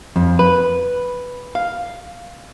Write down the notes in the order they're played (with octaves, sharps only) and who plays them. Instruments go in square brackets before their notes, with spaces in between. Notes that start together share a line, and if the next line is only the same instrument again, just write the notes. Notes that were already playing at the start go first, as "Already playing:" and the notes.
[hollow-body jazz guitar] F2
B4
F5